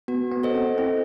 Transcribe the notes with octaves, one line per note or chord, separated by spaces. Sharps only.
B3 F#4
B3
A4 C5 D#5
C4
C4 E4